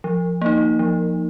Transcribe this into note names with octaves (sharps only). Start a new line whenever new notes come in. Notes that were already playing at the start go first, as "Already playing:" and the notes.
F3
A#3 D#4
F3